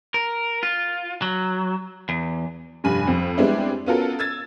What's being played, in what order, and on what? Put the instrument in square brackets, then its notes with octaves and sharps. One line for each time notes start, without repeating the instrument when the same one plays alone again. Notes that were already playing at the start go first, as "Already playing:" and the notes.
[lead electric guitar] A#4
F4
F#3
E2
[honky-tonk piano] F1 G2 G#5 B5
F2 C4
G3 G#3 B3 C4 D4 E4
B3 C#4 F4 F#4 A4 A#4
E6 G#6 A6